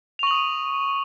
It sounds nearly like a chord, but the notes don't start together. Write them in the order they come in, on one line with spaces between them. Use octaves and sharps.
F7 C#6 F#7 D#6 D#7